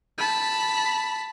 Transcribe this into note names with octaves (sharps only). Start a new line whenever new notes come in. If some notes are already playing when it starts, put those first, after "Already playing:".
A5 B5